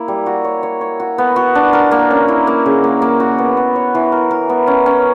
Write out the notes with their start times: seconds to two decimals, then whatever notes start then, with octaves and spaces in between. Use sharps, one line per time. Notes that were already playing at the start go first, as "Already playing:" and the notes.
Already playing: A#3 E4
0.08 G3
0.26 F#4
0.44 C#5
0.63 C#5
0.81 C#5
1.00 F#4
1.18 B3
1.36 F#4
1.55 D4
1.73 A#4
1.91 A#3
2.11 C#4
2.28 E4
2.47 A#3
2.66 C#3
2.84 A#3
3.02 A#3
3.20 F#4
3.38 B3
3.57 B3
3.76 C#5
3.95 E3
4.12 A#4
4.31 A#4
4.49 B3
4.67 C#4
4.86 C#4